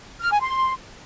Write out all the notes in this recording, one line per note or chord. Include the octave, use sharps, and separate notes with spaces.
F6
G#5
C6